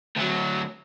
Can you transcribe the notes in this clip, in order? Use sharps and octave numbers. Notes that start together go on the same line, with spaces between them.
D2 F#3